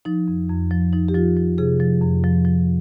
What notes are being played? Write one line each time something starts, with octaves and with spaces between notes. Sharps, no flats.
F3 D#4
F2
F2
F3
F3 D#4
G4
F3 F4
F3
C3 G#4
F3
F2
F3
F3